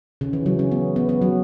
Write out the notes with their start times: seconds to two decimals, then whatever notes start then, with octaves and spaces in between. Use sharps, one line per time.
0.21 C#3
0.33 E3
0.46 F#3
0.59 C#4
0.72 B3
0.96 B3
1.09 B3
1.22 F#3